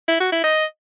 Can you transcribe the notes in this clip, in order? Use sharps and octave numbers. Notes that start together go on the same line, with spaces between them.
E4
F#4
E4
D#5